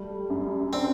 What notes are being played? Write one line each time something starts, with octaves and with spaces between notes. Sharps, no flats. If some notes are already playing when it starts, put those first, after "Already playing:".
Already playing: G3 A3
F#2
C4 D4